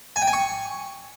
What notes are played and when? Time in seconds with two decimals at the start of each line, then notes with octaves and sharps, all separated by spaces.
0.16 G#5
0.22 G5
0.27 G#5
0.33 C#6